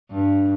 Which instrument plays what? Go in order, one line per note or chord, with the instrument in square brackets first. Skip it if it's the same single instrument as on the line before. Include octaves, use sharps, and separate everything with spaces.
[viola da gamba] G2